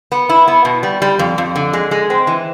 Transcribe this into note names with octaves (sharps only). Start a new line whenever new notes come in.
B3
E4
B3
B2
G3
G3
F2
F2
D3
G#3
G#3
C4
E3